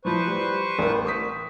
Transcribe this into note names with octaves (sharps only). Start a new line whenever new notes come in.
E3 F3 B4 C5 C#6
G3
A1 A#4
C#6 D#6 B6